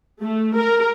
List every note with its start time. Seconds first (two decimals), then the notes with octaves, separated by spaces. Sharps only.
0.21 A3
0.56 A#4